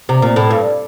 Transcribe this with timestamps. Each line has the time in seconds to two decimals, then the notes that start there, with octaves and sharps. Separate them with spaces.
0.09 C3
0.22 A#2
0.36 A2
0.50 G2